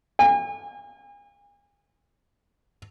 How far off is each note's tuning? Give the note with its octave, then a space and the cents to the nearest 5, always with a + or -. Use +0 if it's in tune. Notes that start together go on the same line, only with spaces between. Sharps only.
G#5 -40